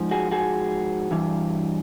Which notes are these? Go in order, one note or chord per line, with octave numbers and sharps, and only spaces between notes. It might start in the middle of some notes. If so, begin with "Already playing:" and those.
Already playing: G#2 F3
F#4 G#4
F#4 G#4
G2 E3